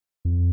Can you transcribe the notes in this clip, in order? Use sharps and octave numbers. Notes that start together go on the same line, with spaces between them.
F2